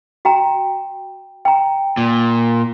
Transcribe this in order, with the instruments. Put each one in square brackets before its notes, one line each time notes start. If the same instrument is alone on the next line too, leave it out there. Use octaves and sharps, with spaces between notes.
[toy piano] F#4 G5 A#5
G5 A#5
[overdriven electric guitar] A#2